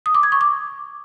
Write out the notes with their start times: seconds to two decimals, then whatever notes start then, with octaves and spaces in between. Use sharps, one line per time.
0.06 D#6
0.15 D6
0.23 G#6
0.32 C#6
0.41 D6